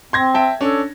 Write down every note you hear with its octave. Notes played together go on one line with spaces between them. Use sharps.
C4 C6 G#6 A#6
E5 G5 A5
C#4 D4 A4